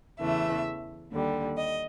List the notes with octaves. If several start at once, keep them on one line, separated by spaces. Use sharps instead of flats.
E2 C#3 E3 A3 E5
D#2 D3 G3
D#5